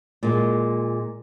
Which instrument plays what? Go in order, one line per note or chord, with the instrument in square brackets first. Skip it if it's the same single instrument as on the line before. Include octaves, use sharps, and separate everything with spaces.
[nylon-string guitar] A#2 G#3